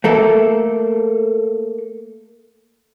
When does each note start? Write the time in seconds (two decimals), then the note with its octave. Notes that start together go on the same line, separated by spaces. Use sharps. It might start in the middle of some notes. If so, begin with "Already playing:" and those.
0.04 A3 A#3 A4